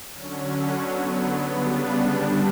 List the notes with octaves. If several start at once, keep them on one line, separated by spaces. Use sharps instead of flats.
D3 F#3 C#4
D3 F#3 B3
C#3 G3 B3 D4
D3 G3 D4